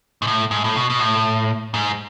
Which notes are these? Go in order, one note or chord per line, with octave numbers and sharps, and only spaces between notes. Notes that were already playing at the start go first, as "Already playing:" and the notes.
G#2
A2
G#2
A2
B2
B2
A2
G#2